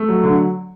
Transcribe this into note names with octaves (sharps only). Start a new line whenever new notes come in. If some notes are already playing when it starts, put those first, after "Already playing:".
Already playing: A3
F#3
D3